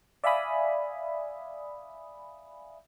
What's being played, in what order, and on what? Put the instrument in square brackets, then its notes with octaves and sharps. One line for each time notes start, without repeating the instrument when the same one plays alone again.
[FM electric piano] D5 E5 F5 G#5 B5 D#6